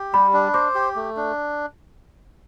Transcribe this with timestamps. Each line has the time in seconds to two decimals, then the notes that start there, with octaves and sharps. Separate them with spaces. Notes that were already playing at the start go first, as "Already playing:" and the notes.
Already playing: G4
0.13 G3 B5
0.33 D4
0.54 C5 D6
0.75 G4
0.96 A3
1.17 D4